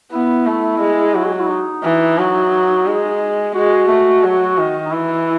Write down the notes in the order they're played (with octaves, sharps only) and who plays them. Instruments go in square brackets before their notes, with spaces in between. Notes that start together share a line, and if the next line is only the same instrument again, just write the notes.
[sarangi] B3 [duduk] E4
[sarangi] A3
G#3
F#3
[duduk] G#4
F#4
E4
D#4
[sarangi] E3
F#3
G#3
[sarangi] G#3 [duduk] F#4
[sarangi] A3
F#3
D#3
[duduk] D#4
[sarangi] E3 [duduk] E4